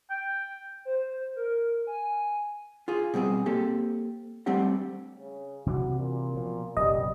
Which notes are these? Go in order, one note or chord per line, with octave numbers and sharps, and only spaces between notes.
G5
C5
A#4
G#5
F4 G#4
B2 G3 C4 G#4
A#3 C4 G4 A4
G3 A3 C4 D4 G4 F#5
C#3
C3 E3 D4 F#4
A#2
B2 F3
D#1 F#2 C3 G3 D#5